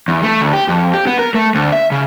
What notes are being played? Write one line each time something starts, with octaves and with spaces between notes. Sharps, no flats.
E2
A3
D2
G4
F2
G4
B3
A#4
A3
D2
E5
C#3